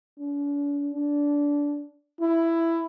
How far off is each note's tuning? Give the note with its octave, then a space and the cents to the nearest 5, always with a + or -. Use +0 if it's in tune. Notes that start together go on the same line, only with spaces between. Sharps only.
D4 -45
D4 -20
E4 +10